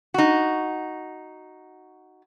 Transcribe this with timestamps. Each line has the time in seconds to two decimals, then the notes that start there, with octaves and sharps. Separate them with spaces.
0.14 D#4 F#4